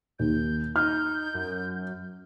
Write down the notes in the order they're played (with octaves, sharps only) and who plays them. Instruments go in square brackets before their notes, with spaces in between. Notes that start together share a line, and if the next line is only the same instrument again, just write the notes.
[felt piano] D#2 [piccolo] G6
[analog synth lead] D#4 [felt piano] F6 [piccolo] G6
[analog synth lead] F#2